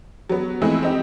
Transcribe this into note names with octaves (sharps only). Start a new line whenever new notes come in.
F#3 B3
E3 F3 G#3 A3 C4 E4
C4 D#4 G4